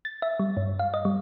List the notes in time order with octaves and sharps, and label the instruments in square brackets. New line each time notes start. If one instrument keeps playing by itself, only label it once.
[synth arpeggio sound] A6
E5
G3
G2
F5
D#5
G3